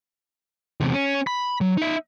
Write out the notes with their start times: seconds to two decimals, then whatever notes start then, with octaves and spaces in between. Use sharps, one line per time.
0.81 E2 C3
0.94 C#4
1.27 B5
1.61 F#3
1.78 D#4 E5